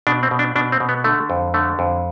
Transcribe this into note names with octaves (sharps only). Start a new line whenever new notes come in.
B2 D4
C4
B2
D4
B2 D4
C4
B2
B3
D3 A3
F2
D3 A3
F2